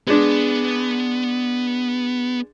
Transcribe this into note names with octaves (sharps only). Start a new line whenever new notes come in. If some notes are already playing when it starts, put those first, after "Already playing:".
G#3 B3 D4